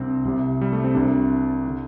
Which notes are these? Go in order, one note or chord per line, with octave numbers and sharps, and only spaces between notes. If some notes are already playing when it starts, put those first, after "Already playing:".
Already playing: C2 C3 C4 D4
C2 C3
G3
A3
C4
C2 C3 D4
D3